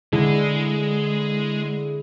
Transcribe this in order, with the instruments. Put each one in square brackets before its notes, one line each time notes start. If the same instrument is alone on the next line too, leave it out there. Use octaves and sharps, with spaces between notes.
[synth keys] D3 E4 G#4 [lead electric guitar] G#3